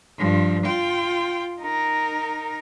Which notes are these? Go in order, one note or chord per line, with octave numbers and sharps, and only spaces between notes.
G2 F3
F4 G5
D#4 A#4